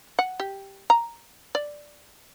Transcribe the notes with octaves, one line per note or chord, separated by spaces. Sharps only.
F#5
G4
A#5
D5